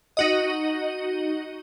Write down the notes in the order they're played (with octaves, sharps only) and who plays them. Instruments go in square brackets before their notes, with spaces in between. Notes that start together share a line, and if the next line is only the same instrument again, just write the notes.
[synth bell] D#4 F#4 D#5